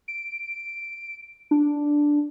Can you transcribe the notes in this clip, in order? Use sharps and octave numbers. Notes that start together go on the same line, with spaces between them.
D7
D4